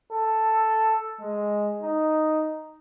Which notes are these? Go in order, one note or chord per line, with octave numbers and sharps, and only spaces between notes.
A4
G#3
D#4